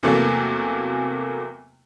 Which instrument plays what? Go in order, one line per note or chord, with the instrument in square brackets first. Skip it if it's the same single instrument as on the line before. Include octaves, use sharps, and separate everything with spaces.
[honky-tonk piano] E2 C3 E3 F#3 A3 A#3